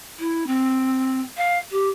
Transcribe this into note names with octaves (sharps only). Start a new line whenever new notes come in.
E4
C4
F5
G4